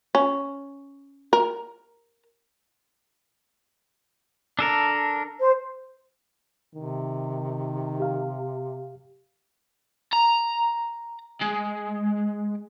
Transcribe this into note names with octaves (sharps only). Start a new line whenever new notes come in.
C#4
A#4
D4 A4 A#4
C5
C3 D#3
G4 F5
A#5
G#3